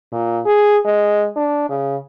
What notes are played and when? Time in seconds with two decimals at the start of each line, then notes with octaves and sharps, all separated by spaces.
0.12 A#2
0.45 G#4
0.85 G#3
1.36 D4
1.69 C#3